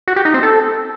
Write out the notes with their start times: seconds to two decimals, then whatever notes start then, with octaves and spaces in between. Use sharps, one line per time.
0.08 F#4
0.16 G4
0.25 D#4
0.34 C4
0.43 A4